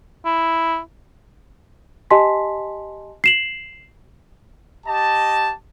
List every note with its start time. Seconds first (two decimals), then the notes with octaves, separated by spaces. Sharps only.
0.26 E4
2.11 G4 D#5 G#5 A5 C6 B6
3.24 C7 E7 F#7
4.86 G4 D#5 A5